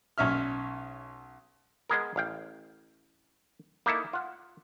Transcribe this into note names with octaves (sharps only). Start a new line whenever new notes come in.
B1 C#4 E5 F6
G#3 B3 G#4 A#4
A1 F5 G5
A#3 D#4 E4 A4
F4 F#5